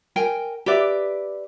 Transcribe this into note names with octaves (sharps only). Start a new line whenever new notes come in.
A#4 G5 G#5
G4 B4 D5 E5